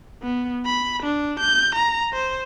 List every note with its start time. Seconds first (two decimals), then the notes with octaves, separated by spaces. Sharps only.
0.22 B3
0.65 B5
1.03 D4
1.39 G6
1.75 A#5
2.13 C5